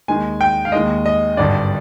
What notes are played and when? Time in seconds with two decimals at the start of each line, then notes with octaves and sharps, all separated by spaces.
0.08 D#2 D#3 G#3 G#5
0.41 G5
0.65 F5
0.72 D#2 D#3 G#3 D#5
1.06 D#5
1.37 G#1 G2 D3 D5